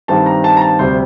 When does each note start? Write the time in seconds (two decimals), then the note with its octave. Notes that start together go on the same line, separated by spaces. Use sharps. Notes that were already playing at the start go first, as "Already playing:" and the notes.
0.08 G2 D#3 G3 C4 A5
0.26 A#5
0.44 A5
0.57 A#5
0.61 A5
0.79 D2 C3 G3 C4 C5